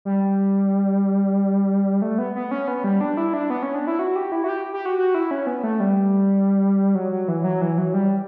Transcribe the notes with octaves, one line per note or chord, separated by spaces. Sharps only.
G3
A3
B3
B3
C#4
B3
G3
D4
E4
D4
B3
C#4
D4
E4
F#4
G4
E4
F#4
G4
G4
F#4
F#4
E4
C#4
B3
A3
G3
F#3
F#3
E3
F#3
E3
F#3
G3